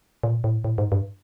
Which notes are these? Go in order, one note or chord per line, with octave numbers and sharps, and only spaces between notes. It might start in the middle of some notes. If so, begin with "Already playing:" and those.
A#2
A2
A2
G#2
G2